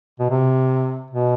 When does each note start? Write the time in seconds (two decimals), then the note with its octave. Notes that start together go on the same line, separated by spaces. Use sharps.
0.20 B2
0.30 C3
1.11 B2